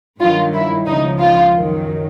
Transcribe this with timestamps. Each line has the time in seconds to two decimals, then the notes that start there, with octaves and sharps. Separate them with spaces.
0.20 G2 D#3 F#3 F4
0.53 E4
0.86 C#2 C#3 F3 D#4
1.19 F4
1.53 F#2 D#3 F#3